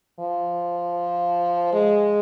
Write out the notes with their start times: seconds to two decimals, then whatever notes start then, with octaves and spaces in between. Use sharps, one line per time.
0.20 F3
1.73 G#3